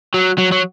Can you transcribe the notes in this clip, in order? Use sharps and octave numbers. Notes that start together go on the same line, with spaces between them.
F#3
F#3
F#3